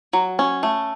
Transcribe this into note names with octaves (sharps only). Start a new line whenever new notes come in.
F#3
C#4
A3